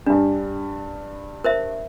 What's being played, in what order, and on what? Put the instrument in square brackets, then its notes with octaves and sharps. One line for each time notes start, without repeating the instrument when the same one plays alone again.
[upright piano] G2 G3 [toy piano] D4
[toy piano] A#4 C5 E5